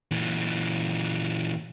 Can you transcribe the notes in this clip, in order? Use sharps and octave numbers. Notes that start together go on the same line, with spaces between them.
A#2 E3